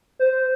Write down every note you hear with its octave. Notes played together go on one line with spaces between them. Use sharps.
C5